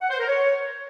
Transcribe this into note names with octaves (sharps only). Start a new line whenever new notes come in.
F#5
C5
A#4
C#5